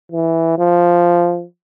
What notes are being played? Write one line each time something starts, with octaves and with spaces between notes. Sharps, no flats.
E3
F3